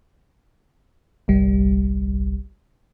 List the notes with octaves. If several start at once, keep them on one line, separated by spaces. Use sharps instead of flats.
G1 C2 G3